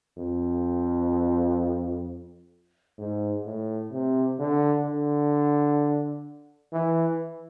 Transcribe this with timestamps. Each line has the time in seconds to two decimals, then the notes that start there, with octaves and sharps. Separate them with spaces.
0.17 F2
2.98 G#2
3.45 A2
3.92 C3
4.39 D3
4.86 D3
6.73 E3